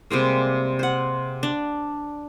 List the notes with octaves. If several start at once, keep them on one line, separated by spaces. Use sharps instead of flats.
C3 G3 G#3 A#3
C5 F#5
D4